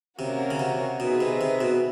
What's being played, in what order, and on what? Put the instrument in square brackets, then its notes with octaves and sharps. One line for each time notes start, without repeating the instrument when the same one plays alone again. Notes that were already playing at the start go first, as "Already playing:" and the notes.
[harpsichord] C3 [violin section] A#3 C#4 F#4 A#4
[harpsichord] C#3
C3
[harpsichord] B2 [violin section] C4 D#4 G#4 B4 E5
[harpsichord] C3
C3
B2